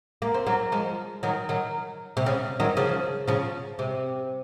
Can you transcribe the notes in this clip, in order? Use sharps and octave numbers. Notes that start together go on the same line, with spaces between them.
A#3
C4
F#3 A#3
F3 G#3
D#3 F#3
D#3 F#3
C3
C#3
D#3 F#3
C#3 F3
C#3 F3
C3